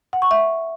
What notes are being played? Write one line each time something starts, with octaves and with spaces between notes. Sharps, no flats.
F#5
C#6
E5